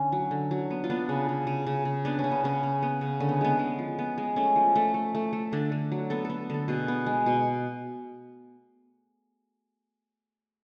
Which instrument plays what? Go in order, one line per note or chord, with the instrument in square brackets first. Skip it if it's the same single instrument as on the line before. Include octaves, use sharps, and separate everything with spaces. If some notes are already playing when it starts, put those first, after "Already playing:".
Already playing: [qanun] D3 C#4
F#3
D3
F#3
B3
F4
B3 D4
C#3
C#3
C#3
C#3
C#3
B3 D4
C#4
C#3
B3
C#3 C#4
C#3
B3
C#3
D3 C#4
B3
G#3 B3
G#3
F3
B3
G#3
A3 C#4
F3
A3
A3
A3
A3
D3 D4
D3
F#3
B3 A4
B3 A4
D3 A4
B2 G#4
B3
G#3
B2